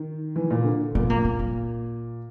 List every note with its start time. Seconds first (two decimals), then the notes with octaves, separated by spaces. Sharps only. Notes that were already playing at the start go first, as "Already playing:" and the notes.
Already playing: D#3
0.36 E3
0.51 A#2
0.64 D3
0.95 A#2 B3
1.10 A#3
1.25 A#3
1.39 A#3